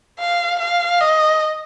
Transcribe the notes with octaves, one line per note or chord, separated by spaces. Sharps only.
F5
F5
D#5